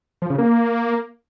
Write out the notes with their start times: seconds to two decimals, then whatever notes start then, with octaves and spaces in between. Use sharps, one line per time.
0.22 F3
0.30 C#3
0.38 A#3